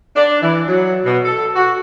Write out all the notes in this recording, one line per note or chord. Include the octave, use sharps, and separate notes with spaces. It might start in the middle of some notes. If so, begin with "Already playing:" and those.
D4
E3
F#3
B2
A4
F#4